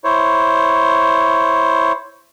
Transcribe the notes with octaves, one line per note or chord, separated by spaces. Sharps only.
E4 C5 C#5